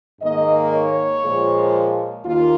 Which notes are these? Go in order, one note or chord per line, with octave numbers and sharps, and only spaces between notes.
G#2 D#3 A#3 D#5
C#5
A#2 F3 G#3
D#2 D#3 A#3 F4